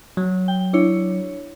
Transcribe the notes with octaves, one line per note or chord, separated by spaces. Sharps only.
F#3
G5
D4 E4 C#5